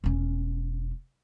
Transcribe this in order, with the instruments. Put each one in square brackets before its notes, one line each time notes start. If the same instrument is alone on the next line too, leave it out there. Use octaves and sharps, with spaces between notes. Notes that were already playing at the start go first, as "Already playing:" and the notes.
[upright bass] E1 C#4